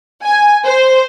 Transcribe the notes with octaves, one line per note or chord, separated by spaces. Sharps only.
G#5
C5